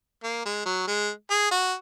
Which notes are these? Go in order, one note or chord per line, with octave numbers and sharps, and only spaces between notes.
A#3
G#3
F#3
G#3
G#4
F#4